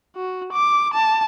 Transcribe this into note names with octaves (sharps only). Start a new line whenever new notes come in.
F#4
D6
A5